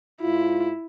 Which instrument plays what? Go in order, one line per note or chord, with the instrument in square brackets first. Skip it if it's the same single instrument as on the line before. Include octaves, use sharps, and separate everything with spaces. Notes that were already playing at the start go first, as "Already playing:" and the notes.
[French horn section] G#2 F4 [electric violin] E4